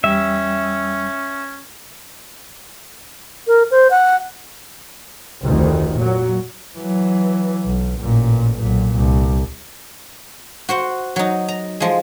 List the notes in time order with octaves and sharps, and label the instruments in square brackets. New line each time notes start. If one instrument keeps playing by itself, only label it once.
[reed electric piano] E2 G3 G5 [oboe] C#4 [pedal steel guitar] E5
[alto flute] A#4
C5
F#5
[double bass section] F1 D2 D#3
A#2 F#3
[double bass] E3 F#3
B1
A1 A#2
B1 A#2
C2
[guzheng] F#4 C5 F#5
F#3 D#4
A#5
F3 G#3